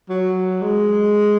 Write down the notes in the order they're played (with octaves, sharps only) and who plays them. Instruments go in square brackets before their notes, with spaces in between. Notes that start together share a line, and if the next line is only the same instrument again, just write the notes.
[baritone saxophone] F#3
G#3